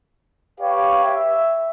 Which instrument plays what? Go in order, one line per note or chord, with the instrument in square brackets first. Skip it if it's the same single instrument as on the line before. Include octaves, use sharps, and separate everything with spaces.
[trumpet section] G4 B4 C#5 F5
E5